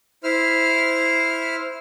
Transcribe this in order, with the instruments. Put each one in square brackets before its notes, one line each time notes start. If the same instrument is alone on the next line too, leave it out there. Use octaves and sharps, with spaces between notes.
[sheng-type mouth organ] E4 C5 F6